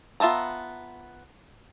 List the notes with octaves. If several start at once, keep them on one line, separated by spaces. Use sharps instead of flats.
B3 F4 E5 A5 A#5